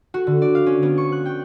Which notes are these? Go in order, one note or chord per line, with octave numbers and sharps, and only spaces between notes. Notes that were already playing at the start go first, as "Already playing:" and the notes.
F#4
D3
D5
F5
C#4
B3
C#6
F#6
G5